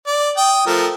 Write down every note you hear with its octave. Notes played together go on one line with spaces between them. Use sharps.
D5
G5 D#6
F3 A3 A#4